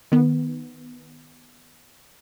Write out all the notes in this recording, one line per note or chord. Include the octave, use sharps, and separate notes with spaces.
D#3 B3